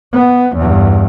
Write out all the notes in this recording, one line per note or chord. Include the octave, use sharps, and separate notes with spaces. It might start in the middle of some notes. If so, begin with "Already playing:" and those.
B3
E2 G2